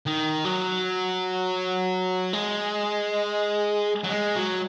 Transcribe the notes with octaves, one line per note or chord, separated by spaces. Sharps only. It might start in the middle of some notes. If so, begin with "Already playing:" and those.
D#3
F#3
G#3
F#3
G#3
F#3